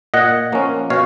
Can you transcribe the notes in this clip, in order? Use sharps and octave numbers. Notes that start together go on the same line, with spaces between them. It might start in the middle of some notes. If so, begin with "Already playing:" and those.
A#2 D#5 F#5
F3 A#3 C#4
B2 C#5 F5